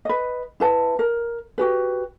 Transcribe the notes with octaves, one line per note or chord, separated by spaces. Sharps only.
B4 D#5
E4 B4 A5
A#4
F#4 G4 B4